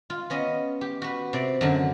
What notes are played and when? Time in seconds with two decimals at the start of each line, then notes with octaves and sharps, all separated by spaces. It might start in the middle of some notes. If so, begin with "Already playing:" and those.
0.10 F4
0.30 B3 C#4 D#5
0.81 G4
1.02 F#4 B4
1.33 C3 D5
1.61 F#2 D3 F#3